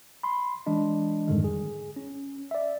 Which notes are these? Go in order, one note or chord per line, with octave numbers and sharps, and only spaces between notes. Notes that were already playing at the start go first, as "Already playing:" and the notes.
B5 C6
E3 G#3 D4 D#5
F2 G#2 D3 D#3 G3 G#3
G#4
C#4
D5 E5